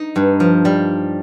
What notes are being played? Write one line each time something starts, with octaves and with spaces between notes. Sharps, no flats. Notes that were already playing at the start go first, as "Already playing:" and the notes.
Already playing: D#4
G2
F3
G3